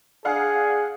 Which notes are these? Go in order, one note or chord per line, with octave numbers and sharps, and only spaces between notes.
D4 G#4 F5 F#5